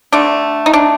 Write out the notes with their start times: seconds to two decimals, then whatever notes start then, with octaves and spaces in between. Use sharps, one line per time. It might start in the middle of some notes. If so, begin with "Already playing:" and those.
0.12 D3 A3 D4
0.66 D#4
0.73 D4